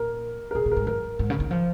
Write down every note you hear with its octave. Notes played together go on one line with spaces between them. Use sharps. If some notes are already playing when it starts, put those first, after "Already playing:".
Already playing: A#2 A#4
A#4
A#2 G#4
A#2
A#4
G#2
F#2 A#4
G#2
C#3
D#3
F3